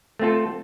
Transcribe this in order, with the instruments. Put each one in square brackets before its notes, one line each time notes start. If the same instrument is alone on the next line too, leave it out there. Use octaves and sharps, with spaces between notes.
[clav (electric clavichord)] A3 C4 F4 A4